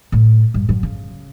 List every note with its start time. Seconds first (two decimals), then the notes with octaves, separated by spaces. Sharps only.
0.12 A2
0.54 G2
0.69 F#2
0.83 C#3